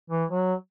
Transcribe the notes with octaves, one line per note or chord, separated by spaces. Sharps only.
E3
F#3